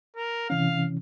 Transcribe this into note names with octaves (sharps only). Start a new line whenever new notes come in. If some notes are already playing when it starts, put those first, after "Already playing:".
A#4
C3 E3 C#4 F5